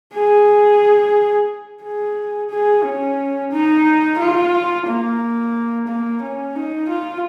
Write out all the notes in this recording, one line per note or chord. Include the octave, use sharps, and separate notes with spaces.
G#4
G#4
G#4
C#4
D#4
F4
A#3
A#3
C#4
D#4
F4